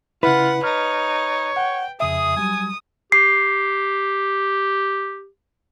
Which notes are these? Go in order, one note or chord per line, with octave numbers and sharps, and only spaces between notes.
C#3 E4 F4 B4 F#5
D#4 C#5 F6
F#5 G5
F2 C#3 G#4 E5 D#6
F#3 G3 G#5
G4 C7